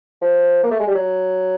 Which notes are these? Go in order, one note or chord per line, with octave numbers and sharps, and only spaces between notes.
F3
A#3
A3
G#3
G3
F#3